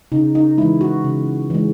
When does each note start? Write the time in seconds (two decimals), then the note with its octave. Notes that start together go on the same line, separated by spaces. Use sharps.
0.12 C#3 D#4
0.35 D#4
0.58 E3 G#3 E4
0.81 F#4
1.04 C#3
1.50 E3 G#3